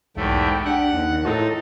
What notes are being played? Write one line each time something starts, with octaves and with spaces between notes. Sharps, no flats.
B1 E2 G#2 A3 G4
D4 F#5
D#2 D#3
A2 D#4 F4 G#4 A4 A5